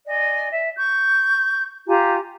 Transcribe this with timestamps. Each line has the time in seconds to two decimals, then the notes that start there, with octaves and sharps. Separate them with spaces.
0.07 D5 D#5 G#5
0.53 E5
0.78 C#6 G6
1.87 F4 G4 G#5 A#5